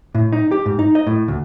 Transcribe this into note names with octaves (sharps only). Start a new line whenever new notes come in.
A2
D#4
G4
G#2
D#4
D#5
A2
D2